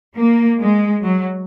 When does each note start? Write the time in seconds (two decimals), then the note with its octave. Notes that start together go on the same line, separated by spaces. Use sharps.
0.17 A#3
0.60 G#3
1.03 F#3